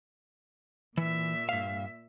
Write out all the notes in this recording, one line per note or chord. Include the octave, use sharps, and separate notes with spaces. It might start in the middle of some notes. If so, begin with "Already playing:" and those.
A#2 E3 E5
G2 F5